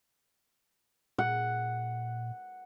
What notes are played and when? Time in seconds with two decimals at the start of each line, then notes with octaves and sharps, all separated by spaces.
1.18 A#2 F#5